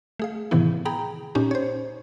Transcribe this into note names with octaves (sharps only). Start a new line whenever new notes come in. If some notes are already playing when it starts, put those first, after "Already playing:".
A3 G#4 F5
A2 C3 D#3 E3 B3 E4
G#4 G5 A#5 B5
A#2 C#4 D#4 G4
C5 C#5